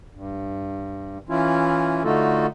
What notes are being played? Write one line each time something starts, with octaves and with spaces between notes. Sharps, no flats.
G2
E3 C#4 E4 F4
D3 A3 D#4 F4 F#4 A4